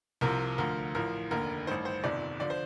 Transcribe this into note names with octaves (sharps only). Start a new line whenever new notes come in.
C2 C3 F3 A#4
D2 D3 F3 A#4
A1 A2 F3 A#4
F1 D#2 D3 A#4
A1 G2 D#3 C5
C5
G1 F2 C3 D#3 D5
D3 F3 D5
C5